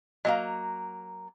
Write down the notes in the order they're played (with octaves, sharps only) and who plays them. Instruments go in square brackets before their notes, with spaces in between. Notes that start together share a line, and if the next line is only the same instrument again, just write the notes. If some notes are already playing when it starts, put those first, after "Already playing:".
[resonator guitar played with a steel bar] F#3 A#3 A#5 [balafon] D#5 F5